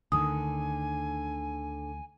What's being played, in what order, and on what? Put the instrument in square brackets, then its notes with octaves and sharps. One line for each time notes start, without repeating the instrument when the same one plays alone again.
[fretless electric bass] D2 D#3 [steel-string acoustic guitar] D3 A4 [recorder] G#5 [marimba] D#6